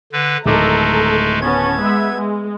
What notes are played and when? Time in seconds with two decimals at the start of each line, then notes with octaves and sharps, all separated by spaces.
0.13 D3 B4
0.46 D1 D#3 G#3 A3 A4 A#5 D6
1.42 B3 C#4 A5 G#6
1.81 G#3 B3 E5
2.14 G#3